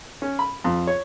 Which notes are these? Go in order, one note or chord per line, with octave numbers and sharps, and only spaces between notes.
C#4
B5
F2
C#5